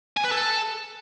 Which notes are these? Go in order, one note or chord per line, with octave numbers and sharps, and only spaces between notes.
G#5
B4
A4